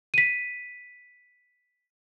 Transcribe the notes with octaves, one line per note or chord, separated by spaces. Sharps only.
B6 D#7